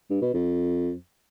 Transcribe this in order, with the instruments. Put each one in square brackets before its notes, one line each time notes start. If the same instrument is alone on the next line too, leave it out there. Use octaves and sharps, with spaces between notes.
[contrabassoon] G2
B2
F2